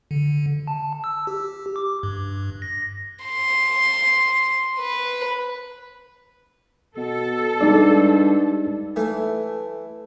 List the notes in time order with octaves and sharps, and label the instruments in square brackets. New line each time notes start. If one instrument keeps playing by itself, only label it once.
[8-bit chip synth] D3
A5
E6
G4
D6
G2
A#6
[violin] C6
B4
[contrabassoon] B2 [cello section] A4
[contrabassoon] G2 [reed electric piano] G#3 D#4 D5
[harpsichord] E3 A3